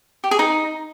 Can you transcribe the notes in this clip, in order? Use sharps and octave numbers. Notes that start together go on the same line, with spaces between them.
G4
G#4
D#4